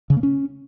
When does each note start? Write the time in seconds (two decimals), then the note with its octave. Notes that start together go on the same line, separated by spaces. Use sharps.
0.10 C#3
0.17 A#3
0.23 C#4